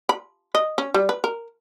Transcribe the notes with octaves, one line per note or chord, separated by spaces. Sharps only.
B5
D#5
C#4
G3
B4
A#4